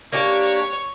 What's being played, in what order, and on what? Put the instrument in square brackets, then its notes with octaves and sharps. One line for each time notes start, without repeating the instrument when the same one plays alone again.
[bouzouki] A#3 D4 G4 [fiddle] C#5
[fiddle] C#5